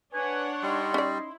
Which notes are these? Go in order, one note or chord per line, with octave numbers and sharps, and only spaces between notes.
D4 B4 C#5 F#5 G#5
G3 D#4 D#5 C6
C#4 E4 D5